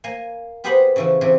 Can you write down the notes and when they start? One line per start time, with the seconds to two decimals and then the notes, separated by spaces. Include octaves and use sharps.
0.04 A#3 G#5
0.64 B3 G4 G#4 B4 C5 B5
0.96 C#3 E3 F3
1.21 C3 E3